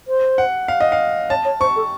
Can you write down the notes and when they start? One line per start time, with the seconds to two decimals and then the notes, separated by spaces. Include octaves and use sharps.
0.08 C5
0.38 F#5
0.68 F5
0.80 D#5
0.92 F5
1.30 C#5 A5
1.45 C#5
1.60 C5 C#6
1.76 A4